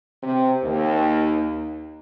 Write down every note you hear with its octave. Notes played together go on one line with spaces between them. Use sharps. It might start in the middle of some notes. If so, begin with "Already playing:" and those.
C3
D#2